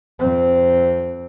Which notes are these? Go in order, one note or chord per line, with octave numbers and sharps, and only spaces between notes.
F2 C4